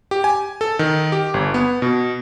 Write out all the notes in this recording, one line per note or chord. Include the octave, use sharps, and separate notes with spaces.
G4
G#5
A4
D#3
G4
G1
B3
B2